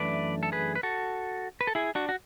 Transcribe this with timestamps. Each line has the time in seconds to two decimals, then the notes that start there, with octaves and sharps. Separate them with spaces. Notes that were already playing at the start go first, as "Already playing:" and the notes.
Already playing: F#2 E3 A3 D4 B4 D5
0.43 A4
0.52 G#4 B4
0.75 B4
0.83 F#4 A4
1.61 B4
1.67 A4
1.75 E4 G#4
1.95 D4 F#4
2.09 F#4